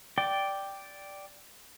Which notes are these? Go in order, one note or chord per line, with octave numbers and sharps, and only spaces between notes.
D5 G5